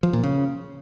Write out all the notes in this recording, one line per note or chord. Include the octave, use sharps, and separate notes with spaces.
F3
A#2
C#3